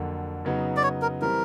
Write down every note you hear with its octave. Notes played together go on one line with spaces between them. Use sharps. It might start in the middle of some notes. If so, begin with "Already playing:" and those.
Already playing: F2 D3 F#3 A#3
C#3 F#3 B3 D#4
D5
C#5
A#4
E3 G3 C4 A#4